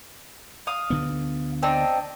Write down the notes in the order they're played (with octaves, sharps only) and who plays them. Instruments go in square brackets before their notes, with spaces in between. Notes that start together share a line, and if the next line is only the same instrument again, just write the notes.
[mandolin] F5 D#6
[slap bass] D2 D3 B3
[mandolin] C4 D4 D#4